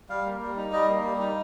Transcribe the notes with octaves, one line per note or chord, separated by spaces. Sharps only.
G3 F5
A#3
G3
D#4
G3 D#5
A#3
G3
D#4